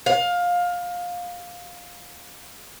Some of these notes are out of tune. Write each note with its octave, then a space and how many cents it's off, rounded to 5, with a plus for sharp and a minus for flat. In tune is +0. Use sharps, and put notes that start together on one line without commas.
F5 +20